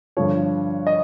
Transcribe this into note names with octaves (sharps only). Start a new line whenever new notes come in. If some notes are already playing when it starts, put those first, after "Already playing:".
G2 D3 F3 C#5
D#5